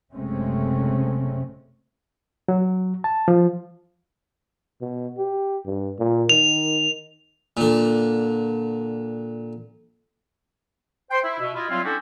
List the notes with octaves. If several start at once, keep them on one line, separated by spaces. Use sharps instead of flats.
F#1 C3 G#3 A3 C4 C#4
F#3
A5
F3
B2
G4
G2
A#2
D#3 F7
A#2 D3
C5 G5 C6
E4
B2 E5
E4 F4 D#5
F#3 G3 C4 E4 F4
C#4 D4 E4 F#4 G4 A4